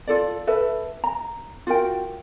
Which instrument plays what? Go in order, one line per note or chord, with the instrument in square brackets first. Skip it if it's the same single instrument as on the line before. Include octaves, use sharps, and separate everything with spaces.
[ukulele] F4 A4 D5
A4 B4 E5
A#5
F4 F#4 A#4 G5